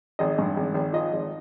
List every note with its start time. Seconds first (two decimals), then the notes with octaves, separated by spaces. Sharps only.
0.19 G#1 D#5
0.39 G2
0.56 G#1
0.74 G#1
0.93 F3 D#5
1.12 G#1